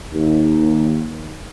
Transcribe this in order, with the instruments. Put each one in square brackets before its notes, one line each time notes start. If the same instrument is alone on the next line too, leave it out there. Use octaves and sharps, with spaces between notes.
[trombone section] D#2